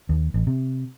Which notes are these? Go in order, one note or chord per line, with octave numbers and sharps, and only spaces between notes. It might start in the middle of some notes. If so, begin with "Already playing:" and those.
D#2
A1
C3